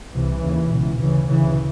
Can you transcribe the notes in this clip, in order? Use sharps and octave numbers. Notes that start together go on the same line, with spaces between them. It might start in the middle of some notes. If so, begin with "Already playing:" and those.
C2 C3 E3
D#2 C#3
C#2 B2
D2 C#3 E3
D2 C#3 E3